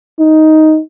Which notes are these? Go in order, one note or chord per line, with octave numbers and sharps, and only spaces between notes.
D#4